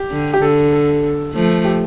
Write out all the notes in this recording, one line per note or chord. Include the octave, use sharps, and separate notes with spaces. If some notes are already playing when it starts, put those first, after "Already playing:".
Already playing: G4
D3
G4
D3 A4
A4
F3 A3
G4